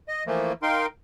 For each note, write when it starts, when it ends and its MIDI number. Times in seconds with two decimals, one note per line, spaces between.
0.08 0.24 75
0.27 0.53 52
0.27 0.53 53
0.27 0.53 57
0.27 0.53 58
0.62 0.86 63
0.62 0.86 70
0.62 0.86 77
0.62 0.86 79
0.62 0.86 84